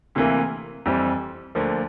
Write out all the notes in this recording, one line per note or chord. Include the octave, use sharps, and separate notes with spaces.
D2 C3 E3 A#3
F2 E3 G3 C4
D2 D3 F3 A#3